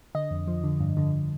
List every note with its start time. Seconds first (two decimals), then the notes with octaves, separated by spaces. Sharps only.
0.15 D3 D#5
0.31 F2
0.47 F3
0.64 D3
0.80 G2
0.97 D3